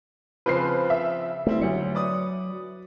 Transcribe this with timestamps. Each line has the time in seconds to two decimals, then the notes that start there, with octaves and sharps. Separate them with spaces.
0.46 C#3 F3 C4 B4 C5 C7
0.90 E5
1.47 G3 A3 C4 E4
1.62 D2 F#3 C#7
1.95 B4 D5 D#6